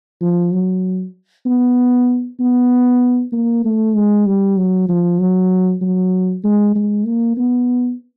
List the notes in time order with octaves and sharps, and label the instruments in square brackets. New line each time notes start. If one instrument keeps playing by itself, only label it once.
[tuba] F3
F#3
B3
B3
A#3
A3
G#3
G3
F#3
F3
F#3
F#3
G#3
G#3
A#3
B3